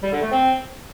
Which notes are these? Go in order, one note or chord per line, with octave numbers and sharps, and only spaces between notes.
G3
D3
A3
C4